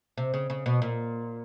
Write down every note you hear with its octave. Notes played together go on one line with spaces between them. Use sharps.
C3
C#3
C#3
B2
A#2